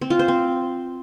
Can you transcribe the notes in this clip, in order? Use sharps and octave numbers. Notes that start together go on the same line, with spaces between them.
C4
F4
C5
C4